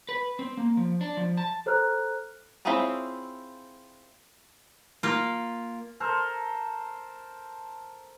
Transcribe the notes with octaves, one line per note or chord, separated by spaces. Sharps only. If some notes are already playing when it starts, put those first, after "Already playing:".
B4
C4
A#3
F3
D4
F3
A5
A4 C5 A#5 F6 F#6
C4 E4 F4 G#4 C#5
A#3 F4
A4 A#4 C5